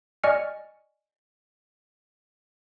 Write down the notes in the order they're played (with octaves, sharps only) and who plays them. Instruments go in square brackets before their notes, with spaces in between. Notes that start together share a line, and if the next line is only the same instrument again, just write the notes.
[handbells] D5 D#5 G#5 C#6 F6 C#7